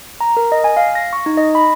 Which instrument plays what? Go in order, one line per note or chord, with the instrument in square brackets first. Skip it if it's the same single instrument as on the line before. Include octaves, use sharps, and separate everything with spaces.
[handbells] A#5
A#4
D#5
G#5
F5
A#6
C#6
D#4
D#5
B5